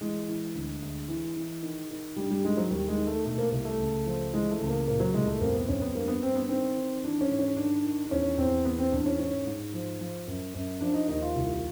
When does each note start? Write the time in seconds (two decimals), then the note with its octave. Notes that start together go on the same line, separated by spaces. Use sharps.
0.01 E3 G#3
0.28 E3
0.55 D2
0.82 D2
1.08 E3
1.36 E3
1.63 D#3
1.91 D#3
2.16 G2 G3
2.31 G3
2.44 D#3 G#3
2.57 F#3
2.70 D#2 G3
2.88 G#3
2.97 D#3
3.07 A3
3.25 B2 A3
3.38 A#3
3.51 C2 A#3
3.65 A3
3.79 C#2
4.06 F3
4.33 E3 G#3
4.51 A3
4.61 C#2
4.68 A#3
4.87 A#2 A#3
5.00 F#3
5.14 C2 G#3
5.27 A3
5.40 F2 A#3
5.54 B3
5.68 F2 C#4
5.82 B3
5.95 G2 A#3
6.08 B3
6.22 G2 C4
6.36 B3
6.49 D#3 C4
6.77 D#3
7.04 E3 D4
7.21 C#4
7.30 G#2
7.39 C#4
7.56 D#3 D4
7.84 D#3
8.06 D4
8.11 E2 C#4
8.38 E2 C4
8.65 E2 B3
8.78 C4
8.92 E2 D4
9.06 C#4
9.19 G#2 C#4
9.47 G#2
9.74 F3
10.00 F3
10.27 F#2
10.54 F#2
10.81 F3 D4
10.94 D#4
11.08 D#2 D#4
11.22 F4
11.35 C2